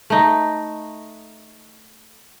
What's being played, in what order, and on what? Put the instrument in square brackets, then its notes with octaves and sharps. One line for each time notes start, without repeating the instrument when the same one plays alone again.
[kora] A3 D#4